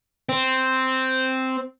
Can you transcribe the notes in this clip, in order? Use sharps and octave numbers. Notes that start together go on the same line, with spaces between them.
C4